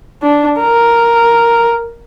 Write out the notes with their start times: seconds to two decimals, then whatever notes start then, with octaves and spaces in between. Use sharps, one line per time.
0.22 D4
0.59 A#4